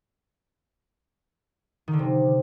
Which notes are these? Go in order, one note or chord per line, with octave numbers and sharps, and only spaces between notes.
D#3
D3
C3